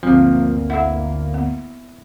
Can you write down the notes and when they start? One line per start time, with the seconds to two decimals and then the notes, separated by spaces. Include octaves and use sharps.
0.03 G1 D2 F3 A#3 C4
0.70 E4 A4 E5 F#5
1.34 B3